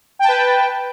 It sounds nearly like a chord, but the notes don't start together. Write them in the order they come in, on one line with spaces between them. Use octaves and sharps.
G5 A5 B4